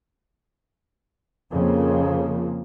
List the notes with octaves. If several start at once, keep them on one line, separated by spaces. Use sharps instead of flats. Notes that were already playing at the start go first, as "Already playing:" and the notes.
F2 C#3 F3 A#3